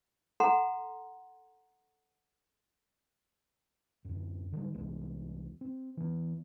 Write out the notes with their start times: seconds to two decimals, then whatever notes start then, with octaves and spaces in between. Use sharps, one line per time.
0.40 A4 F#5 A#5 C6
4.05 D1 F#2
4.52 D3 D#3 F#3 G3
4.74 C2 E3 G#3 B3
5.61 C4
5.97 E3 B3